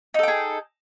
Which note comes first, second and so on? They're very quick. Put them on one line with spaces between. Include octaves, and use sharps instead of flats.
D#4 A4 G5 G#4